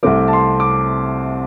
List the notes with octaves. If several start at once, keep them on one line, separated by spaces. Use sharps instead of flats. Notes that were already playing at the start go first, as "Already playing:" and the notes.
C2 C3 A3 C4 D6
A5
C6
D6